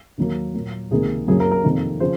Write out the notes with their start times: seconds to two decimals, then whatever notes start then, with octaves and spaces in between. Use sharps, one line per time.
0.18 D#2 D#3 F#3 A#3
0.54 A#2 F#3 A#3
0.91 C#2 C3 D#3 A#3 G#4
1.27 F#2 C#3 F#3 A#3 G#4
1.40 A#4
1.51 A#4
1.64 F2 C3 D#3 A#3
2.00 C#3 F3 C5